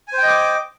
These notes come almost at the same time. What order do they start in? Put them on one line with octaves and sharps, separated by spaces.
G#5 C5 G5 D#5 D6